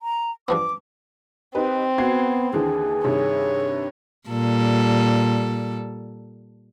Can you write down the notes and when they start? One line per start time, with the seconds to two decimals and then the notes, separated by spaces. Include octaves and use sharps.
0.02 A#5
0.48 G2 F3 B3 D6
1.55 C4 D#4 G4 B4
1.98 B3 F#4 G#6 C7
2.53 D#2 D3 E3 G#4
3.04 G2 C3 D#3 C#5
4.29 A#2 G3 A4